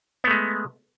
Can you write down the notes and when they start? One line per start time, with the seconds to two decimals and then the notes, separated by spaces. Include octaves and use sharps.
0.24 B3
0.27 A3
0.31 G#3